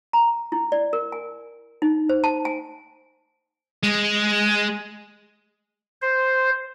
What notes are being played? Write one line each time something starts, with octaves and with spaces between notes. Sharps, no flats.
A#5
E4
D5
A#4
G#5
D#4
C5
A5
G#5
G#3
C5